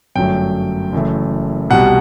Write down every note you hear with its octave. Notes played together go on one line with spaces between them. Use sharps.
G1 F#2 F#3 A3 G5
F#1 F#2 E3 A3
C2 B2 G3 F#5